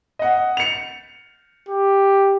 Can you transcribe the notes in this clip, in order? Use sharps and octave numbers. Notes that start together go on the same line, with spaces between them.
D#5 F#5
C#7 F7
G4